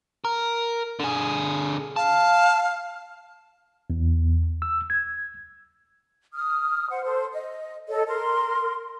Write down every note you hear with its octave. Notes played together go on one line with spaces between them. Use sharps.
A#4
D3 G#4
F5 A5
E2
E6
G#6
D#6 F6
C5 F#5
A4 C5
D#5
A4 C#5 D#5
A#4 C6